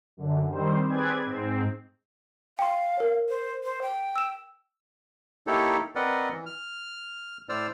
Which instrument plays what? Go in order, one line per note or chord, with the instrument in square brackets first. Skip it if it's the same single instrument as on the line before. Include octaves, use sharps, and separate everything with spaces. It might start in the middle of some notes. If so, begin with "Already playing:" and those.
[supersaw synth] F#2 D3
D#3 G3 C4 C5
C4 G#4 B4 D5 G#6
G#2 C4
[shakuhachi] F5 [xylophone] G5 C6
[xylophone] A#4 C#5
[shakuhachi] C5
C5
G5
[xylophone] E6 E7
[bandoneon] A#3 D#4 E4 G4 A4 C#5
C4 A#4 B4 D5 D#5 F#5
E3
F6
A2 C5 D5 E6 F6